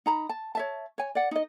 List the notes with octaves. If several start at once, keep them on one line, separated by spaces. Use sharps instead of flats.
D#4 A#5 B5
A5
C#5 E5 A5
C#5 G#5
D5 F#5
D#4 D#5